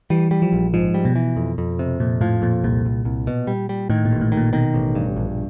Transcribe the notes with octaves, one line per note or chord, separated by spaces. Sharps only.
E3 G3
G3
F3
A#1
G#2 F3
G3
B2
E3
F2
F2
C3
F2 A#2
A2 F3
F2 A#2
C2 A#2
C2
C2
B2
G3
G3
A2 D#3
A#2
A1
A2
D#3
A#2
B2 D#3
A1
G2
A#1